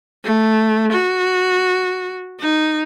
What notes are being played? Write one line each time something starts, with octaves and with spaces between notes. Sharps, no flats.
A3
F#4
D#4